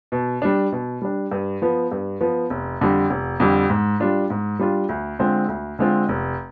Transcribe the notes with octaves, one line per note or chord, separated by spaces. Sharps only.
B2
G3 D4
B2
G3 D4
G2
F3 B3
G2
F3 B3
F1
F2 D3 G3
F1
F2 D3 G3
G#2
G3 D4 F4
G#2
G3 D4 F4
D2
D3 G#3 C4 F4
D2
D3 G#3 C4 F4
F1